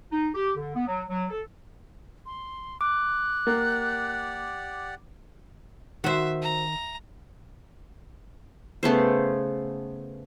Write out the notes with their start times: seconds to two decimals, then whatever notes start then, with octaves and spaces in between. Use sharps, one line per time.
0.12 D#4
0.34 G4
0.57 D3
0.76 B3
0.88 F#3
1.09 F#3
1.30 A4
2.26 C6
2.81 D6 F#6
3.47 A#3 G4 D5 F#5
6.04 D#3 F#4 C5 E5
6.42 A#5
8.83 C#3 A3 B3 C5